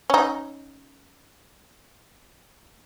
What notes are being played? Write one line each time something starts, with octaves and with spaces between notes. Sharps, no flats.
C#4 D#4